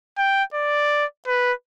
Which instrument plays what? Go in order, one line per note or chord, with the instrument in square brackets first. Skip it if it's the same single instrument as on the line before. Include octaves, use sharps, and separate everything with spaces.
[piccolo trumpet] G5
D5
B4